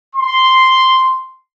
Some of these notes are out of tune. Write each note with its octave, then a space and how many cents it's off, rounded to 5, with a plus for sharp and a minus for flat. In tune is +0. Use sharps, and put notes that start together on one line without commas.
C6 -5